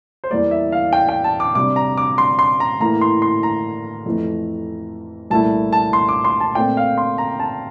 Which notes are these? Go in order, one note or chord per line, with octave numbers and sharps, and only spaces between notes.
C5
E2 E3 G3 A#3 D5
E5
F5
G5
G5
A5
D6
C3 G3 D4 D6
A#5
D6
C6
C6
A#5
A2 E3 A#3 E4 A#5
C6
C6
A#5
F2 E3 A3
C2 A#2 A3 E4 A5
A5
C6
D6
C6
A5
A#2 A3 C4 G5
F5
C6
A#5
A5